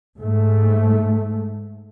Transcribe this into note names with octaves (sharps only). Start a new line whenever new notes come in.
G#2 A3